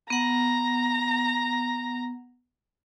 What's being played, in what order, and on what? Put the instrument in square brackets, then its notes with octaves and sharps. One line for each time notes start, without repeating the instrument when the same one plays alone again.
[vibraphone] B3 F#5 [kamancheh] A#5